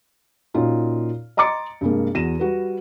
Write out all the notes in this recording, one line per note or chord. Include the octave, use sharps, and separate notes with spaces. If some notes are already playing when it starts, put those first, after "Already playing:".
A#2 C#4 D#4 F4 F#4
D#5 A#5 C6 D6 A6 C#7
G2 C3 G#3 A#3
E2 F#4 A#6 D#7 E7
G3 F#4 B4